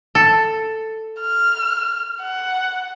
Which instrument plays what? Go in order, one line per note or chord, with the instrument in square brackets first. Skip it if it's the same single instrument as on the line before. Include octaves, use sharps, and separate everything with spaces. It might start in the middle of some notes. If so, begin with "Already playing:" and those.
[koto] A4
[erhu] F6
F#5